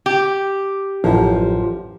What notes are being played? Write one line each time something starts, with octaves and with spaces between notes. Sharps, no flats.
G4
A1 F#2 F3